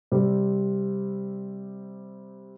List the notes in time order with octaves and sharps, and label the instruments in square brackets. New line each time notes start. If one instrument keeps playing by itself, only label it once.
[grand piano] C3 G3 C4